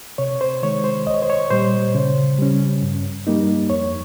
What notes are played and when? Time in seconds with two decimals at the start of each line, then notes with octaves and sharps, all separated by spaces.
0.18 C3 C#5
0.41 C5
0.63 D#3 G#3 C#5
0.84 C5
1.07 C2 D#5
1.14 C#5
1.22 C5
1.30 C#5
1.51 A#2 G3 C5
1.95 C#3
2.38 G3 C#4
2.82 G2
3.27 G3 A#3 D#4
3.70 F2 C#5